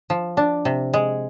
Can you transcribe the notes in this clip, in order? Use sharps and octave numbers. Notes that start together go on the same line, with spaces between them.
F3
D4
C3
G#3